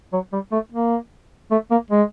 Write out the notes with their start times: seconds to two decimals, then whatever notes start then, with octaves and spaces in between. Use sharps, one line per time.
0.13 F#3
0.32 G3
0.52 A3
0.72 A#3
1.51 A3
1.71 A#3
1.90 G#3